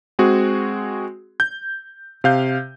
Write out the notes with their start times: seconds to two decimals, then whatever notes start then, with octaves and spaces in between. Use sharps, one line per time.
0.19 G#3 C4 F#4 G#4
1.40 G6
2.24 C3 F5 G6